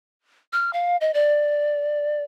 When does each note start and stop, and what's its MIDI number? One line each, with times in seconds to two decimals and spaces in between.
0.53 0.73 89
0.73 0.97 77
1.01 1.11 75
1.14 2.23 74